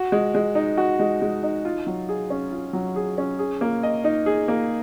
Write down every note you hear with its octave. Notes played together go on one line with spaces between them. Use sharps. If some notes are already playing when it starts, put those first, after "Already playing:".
Already playing: F#4
G#3
G#3
D#4
F#4
G#3
G#3
D#4
F4
F#3
G#4
C#4
F4
F#3
G#4
C#4
G#4
A#3
D#5
D#4
G#4
A#3